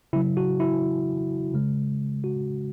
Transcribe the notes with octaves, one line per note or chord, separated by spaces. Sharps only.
C#3 F#3 E4
F#4
E4
C#3 G#3
F#4